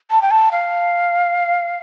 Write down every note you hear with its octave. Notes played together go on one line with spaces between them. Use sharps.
A5
G5
A5
F5